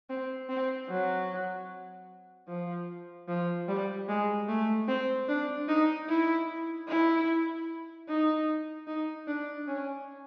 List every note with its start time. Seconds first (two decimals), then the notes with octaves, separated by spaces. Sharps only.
0.10 C4
0.49 C4
0.89 F#3
2.48 F3
3.28 F3
3.68 G3
4.08 G#3
4.48 A3
4.88 C4
5.28 D4
5.68 D#4
6.08 E4
6.88 E4
8.08 D#4
8.87 D#4
9.28 D4
9.67 C#4